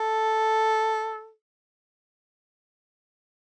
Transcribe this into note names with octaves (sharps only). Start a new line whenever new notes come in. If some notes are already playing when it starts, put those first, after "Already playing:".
Already playing: A4